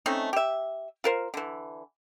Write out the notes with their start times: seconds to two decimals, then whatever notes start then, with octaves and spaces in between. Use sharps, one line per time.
0.06 A3 C4 C#4 D#4
0.33 G4 E5
1.04 F4 A#4 C5
1.34 D3 E3